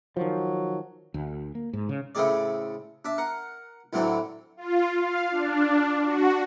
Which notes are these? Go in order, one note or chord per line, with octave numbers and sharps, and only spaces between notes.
D#3 F3 F#3
D2
A#3
G#2
C#3
A2 C#3 A3 C4 G#4 D5
D4 E5
A#4 F#5
D2 A2 D3 E3 F#3 C4
F4
F5
D4
F#4